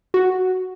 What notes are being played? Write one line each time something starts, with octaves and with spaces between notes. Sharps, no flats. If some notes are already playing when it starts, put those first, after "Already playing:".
F#4